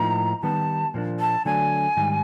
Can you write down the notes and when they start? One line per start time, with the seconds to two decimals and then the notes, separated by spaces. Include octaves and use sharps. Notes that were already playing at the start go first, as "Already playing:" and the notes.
Already playing: A2 F3 A#3 D#4 A#5
0.43 D#3 G3 B3 A5
0.94 A#2 F3 A#3 D4
1.20 A5
1.45 D3 F#3 A3 D4 G#5
1.97 G#2 D#3 G3